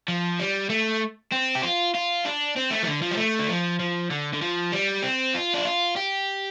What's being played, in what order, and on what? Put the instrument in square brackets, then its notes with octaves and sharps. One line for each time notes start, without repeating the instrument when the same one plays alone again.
[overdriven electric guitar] F3
G3
A3
C4
G4
F4
F4
D4
C4
A3
F3
D3
F3
G3
A3
D3
F3
F3
D3
D3
F3
G3
C4
F4
D4
F4
G4